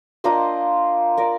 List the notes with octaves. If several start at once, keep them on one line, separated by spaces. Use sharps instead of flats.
A#3 D4 F4 C5 D#5
A#4 D5